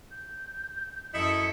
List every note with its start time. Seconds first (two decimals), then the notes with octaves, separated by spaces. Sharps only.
0.11 G6
1.14 F#2 E4 A4 D#5 C#7